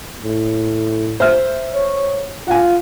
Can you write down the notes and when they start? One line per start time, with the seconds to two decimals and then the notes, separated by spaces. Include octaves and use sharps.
0.22 A2
1.20 C5 E5 F6
1.74 C#5
2.48 F4 F#5 G#5